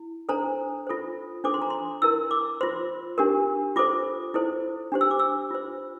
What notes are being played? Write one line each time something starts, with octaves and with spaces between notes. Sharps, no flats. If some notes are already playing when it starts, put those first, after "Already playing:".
Already playing: E4
D4 A4 C5 A#5
F4 A4 C5
D4 A4 C5 D6
C6
A#5
C6
E4 A#4 E6
D6
F4 C5 C6
D4 G4 A#4
F4 A4 C5 D6
E4 A4 C5
D4 G4 C5
E6
D6
E6
F4 C5